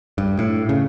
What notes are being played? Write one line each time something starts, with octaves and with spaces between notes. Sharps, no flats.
G2
A2
C#3